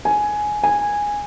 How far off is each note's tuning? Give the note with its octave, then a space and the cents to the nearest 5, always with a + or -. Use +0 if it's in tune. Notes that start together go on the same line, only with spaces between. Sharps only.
G#5 +10
G#5 -10